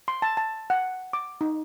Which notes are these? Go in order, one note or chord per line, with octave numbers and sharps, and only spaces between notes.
C6
A5
A5
F#5
D6
D#4